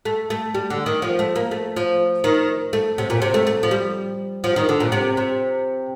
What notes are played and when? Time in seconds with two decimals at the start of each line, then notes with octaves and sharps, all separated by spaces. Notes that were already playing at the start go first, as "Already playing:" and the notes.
0.05 A3
0.30 A3
0.55 G3
0.70 D3
0.86 D#3
1.02 F3
1.19 A3
1.36 A#3
1.51 A3
1.76 F3
2.24 D#3
2.73 A3
2.98 C3
3.10 A#2
3.22 C3
3.34 A3
3.47 A3
3.63 F3
3.71 G3
4.44 F3
4.56 D#3
4.69 D3
4.80 A#2
4.92 C3
5.17 C3